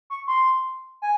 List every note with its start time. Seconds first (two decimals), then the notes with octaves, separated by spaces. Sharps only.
0.10 C#6
0.28 C6
1.02 G#5